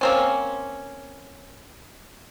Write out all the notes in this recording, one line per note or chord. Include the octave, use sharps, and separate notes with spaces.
A#3 C4 C#4